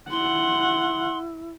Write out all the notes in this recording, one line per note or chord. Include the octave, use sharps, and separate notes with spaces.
E4 F#5 C6